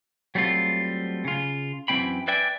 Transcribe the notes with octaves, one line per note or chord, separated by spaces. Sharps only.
F#3 G3 A3 C4 F4
C#3 F4
F#2 E3 G#3 C4 G5 B5
B4 D5 E5 G5 G#5